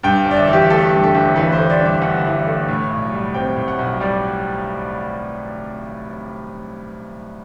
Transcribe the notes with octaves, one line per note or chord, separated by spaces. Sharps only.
G2 G5
G1
D5
E5
E3
G4
A3 A4
G2
A4
G1
E3 B4
C5
A3
D5
G2 E5
G1 F#5
E3
A3
A2
B1
G3
C4 G5
A2
F#5
B1
G3 D5